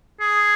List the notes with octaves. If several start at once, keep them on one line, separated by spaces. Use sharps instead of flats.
G#4